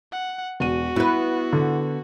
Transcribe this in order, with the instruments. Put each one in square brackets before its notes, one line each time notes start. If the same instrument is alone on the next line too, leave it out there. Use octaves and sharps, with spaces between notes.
[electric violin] F#5
[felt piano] E1 D#7 [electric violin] F#4
[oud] B3 B4 [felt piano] E4
[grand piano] D3